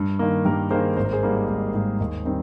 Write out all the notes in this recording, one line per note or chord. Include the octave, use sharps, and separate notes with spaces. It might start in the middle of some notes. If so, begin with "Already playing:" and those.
Already playing: G2
D#3 A#3
G2 G4 A#4
D#3 A#3 G#4 C5
G#1 C5
A#4
G#4 C5
G#2 G3 A#3
G#1
G#2 G3 A#3
D#2
D#3 G3 C4